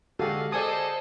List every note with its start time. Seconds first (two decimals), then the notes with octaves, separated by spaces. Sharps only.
0.20 D3 G#3 F#4 G4 A4 F5 F#5
0.52 G#4 A4 C5 D5 D#5 G#5 D#6